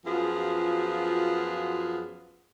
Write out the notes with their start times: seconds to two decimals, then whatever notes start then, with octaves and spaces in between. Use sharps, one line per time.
0.06 F#2 F3 B3 F4 F#4 G#4